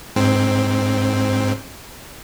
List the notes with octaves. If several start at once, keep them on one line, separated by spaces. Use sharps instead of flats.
G#2 C4